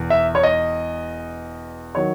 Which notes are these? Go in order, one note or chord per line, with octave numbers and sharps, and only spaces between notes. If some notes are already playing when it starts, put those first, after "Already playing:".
Already playing: E1 E2
E5
C#5
D#5
D#3 F#3 C#5